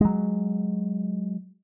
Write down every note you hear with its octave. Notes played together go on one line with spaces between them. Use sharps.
F#3 G#3